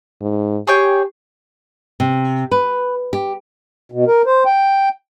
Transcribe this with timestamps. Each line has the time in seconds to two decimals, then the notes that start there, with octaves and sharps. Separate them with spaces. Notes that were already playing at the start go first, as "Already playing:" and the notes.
0.21 G#2
0.67 G4 G#4 C#5 G5
2.00 C3
2.51 B4
3.13 G4
3.92 B2
4.07 A#4
4.26 C5
4.46 G5